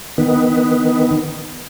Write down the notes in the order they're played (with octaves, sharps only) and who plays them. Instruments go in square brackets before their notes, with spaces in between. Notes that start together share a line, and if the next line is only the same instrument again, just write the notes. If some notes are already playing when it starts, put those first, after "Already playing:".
[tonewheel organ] D#3 B3